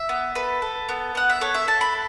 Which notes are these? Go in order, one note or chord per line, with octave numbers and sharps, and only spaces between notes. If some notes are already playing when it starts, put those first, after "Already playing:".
Already playing: E5
B3
A4 B4
A4
B3
B3 F#5
E5
A4 C#5
E5
A4 A5
B5